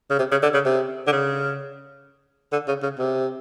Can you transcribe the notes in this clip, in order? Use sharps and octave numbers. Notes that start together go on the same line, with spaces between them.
C#3
C3
C#3
D3
C#3
C3
D3
C#3
D3
C#3
C#3
C3